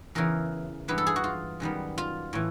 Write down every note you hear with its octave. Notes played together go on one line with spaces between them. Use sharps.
E2 C#3 E3 A#4
G2 E3 G#3 B3 B4
A4
G#4
F#4
F4
F#2 D#3 G3 B3
F4
A2 E3